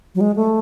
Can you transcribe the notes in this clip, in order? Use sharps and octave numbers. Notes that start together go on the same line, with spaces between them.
F#3
G#3
A3